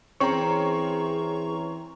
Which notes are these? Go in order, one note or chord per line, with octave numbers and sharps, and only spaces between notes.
E3 C4 C#4 G#4 A#5 C#6